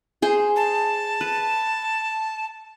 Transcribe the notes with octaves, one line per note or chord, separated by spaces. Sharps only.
G#4 C5
A5
B4